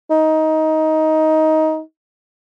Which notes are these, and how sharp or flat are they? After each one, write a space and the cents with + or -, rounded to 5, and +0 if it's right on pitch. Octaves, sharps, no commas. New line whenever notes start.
D#4 +15